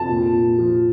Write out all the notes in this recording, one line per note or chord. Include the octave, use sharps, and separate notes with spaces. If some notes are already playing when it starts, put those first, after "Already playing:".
Already playing: F2 A5
A#2
A#2
F3